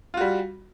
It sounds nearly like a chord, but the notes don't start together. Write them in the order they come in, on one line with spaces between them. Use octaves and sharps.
F4 F#4 G3